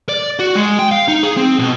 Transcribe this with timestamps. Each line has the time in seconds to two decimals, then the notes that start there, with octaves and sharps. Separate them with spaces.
0.09 D5
0.39 F#4
0.55 G#3
0.79 G5
0.91 F5
1.08 D#4
1.23 G#4
1.37 C4
1.59 B2